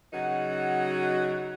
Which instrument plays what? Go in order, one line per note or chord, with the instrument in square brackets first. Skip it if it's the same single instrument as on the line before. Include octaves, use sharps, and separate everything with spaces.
[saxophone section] C#3 F#3 D#4 F#4 F#5